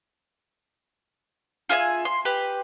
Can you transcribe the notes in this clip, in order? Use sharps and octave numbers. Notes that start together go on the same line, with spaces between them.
F4 G#4 E5 G#5
C6
G4 B4